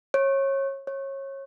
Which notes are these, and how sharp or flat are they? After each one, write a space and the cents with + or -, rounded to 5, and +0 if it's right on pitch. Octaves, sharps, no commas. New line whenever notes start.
C#5 -25
C#5 -25